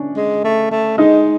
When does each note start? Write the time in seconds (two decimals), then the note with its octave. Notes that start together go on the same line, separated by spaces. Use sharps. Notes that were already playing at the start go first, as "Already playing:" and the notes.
Already playing: C#4 D4
0.17 G#3
0.44 A3
0.71 A3
0.98 G#3 D#4